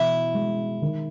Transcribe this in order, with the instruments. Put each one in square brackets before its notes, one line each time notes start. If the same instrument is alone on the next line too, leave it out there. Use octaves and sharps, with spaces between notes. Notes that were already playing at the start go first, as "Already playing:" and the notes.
Already playing: [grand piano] B2 E3 [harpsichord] E4
[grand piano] G#3
D#3